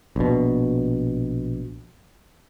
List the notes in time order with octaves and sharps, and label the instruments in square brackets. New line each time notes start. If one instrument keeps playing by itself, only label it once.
[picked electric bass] A#1 B2